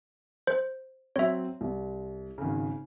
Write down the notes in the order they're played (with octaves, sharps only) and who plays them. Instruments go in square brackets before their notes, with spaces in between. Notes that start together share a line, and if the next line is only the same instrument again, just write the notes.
[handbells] C5
[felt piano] F#3 C4 [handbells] C#5 E5
[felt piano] C2
G#1 C#3